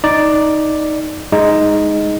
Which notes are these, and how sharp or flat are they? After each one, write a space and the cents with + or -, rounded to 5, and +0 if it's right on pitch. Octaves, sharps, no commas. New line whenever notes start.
D#4 +0 D5 +0
G#3 +0 D#4 +0 D#5 +0